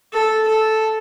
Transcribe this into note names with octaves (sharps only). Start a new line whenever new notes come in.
A4
A4